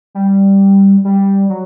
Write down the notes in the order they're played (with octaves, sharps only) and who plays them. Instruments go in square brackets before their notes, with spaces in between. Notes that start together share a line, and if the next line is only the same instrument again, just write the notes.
[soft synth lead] G3
G3
F#3